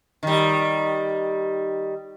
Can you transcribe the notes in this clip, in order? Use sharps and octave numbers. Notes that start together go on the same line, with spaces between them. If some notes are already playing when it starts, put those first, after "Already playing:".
D#3 G3